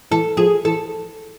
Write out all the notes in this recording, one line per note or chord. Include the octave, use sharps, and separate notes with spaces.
E3 A4
F3 G#4
E3 A4